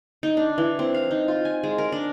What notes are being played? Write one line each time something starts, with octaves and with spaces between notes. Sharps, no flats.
D#4
D4
E3
C4
F5
D#4
F4
G#5
G#3
A#4
D4